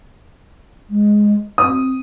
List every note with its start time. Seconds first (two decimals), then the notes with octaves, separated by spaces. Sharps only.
0.90 G#3
1.58 C4 D#6